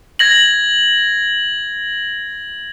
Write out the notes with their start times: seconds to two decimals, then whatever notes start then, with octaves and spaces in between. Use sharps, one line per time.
0.19 G#6 A#6 F#7